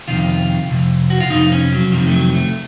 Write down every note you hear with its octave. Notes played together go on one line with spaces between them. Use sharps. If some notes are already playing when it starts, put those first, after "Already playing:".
F2 C3 D#3 F4
F2 C3
F#4
F4
F2 C3 D#4
C#4
F#3
F2 C3 D#3 F3
A3
F#3
A3